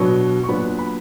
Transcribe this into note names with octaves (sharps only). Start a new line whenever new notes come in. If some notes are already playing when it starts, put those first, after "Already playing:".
Already playing: B2 F#3 B3 D4 C#6
C#6
A#2 F#3 B3 D4 B5
B5